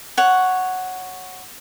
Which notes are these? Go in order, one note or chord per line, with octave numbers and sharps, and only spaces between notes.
C#5 F#5